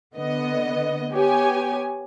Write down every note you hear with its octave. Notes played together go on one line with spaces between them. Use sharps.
D3 B3 D#5
B3 G4 C#5 G#5